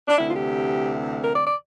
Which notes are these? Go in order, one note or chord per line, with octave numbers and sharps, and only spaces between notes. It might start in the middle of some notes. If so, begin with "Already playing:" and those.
D4
D2 C3 E3 E4
F4
G4
A#4
D5
D5